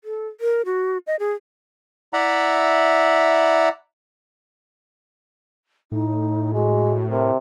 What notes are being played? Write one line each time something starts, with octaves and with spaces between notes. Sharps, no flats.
A4
A#4
F#4
D#5
G#4
E4 D5 E5 F#5 A#5 B5
A2 D#4
G#3 F#4
C3 A#4